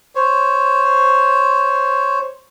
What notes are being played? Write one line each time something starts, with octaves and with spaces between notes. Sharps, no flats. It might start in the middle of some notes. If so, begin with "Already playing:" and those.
C5 C#5